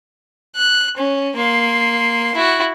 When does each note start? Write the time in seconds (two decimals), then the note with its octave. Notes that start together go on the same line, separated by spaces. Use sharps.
0.56 F#6
0.97 C#4
1.36 A#3 C6
2.35 E4 F#4